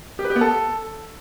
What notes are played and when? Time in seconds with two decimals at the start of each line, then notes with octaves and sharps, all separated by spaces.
0.19 G4
0.24 B4
0.30 G4
0.36 B3
0.41 A4